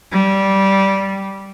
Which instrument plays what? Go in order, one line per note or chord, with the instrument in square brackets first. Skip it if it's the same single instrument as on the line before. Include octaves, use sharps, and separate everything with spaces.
[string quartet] G3